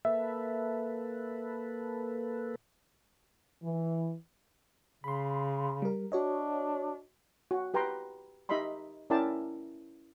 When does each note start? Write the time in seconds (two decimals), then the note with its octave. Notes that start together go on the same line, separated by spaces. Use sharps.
0.05 A#3 A4 B4 E5
3.63 E3
5.04 C#3 B5 C6
5.82 G3 A#4
6.12 D4 F#4 C#5 D#5
7.51 F#4
7.74 G4 B4 G5 A#5 C6
8.49 D#4 G4 D#5 E5 B5 C6
9.10 C#4 E4 A#4 D5 G5 A5